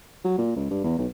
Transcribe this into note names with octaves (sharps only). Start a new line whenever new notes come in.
F#3
A#2
C#2
G2
E2
B1